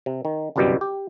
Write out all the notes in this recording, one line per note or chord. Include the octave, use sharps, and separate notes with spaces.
C3
D#3
G1 C2 F#2 B2 G3 G4
G4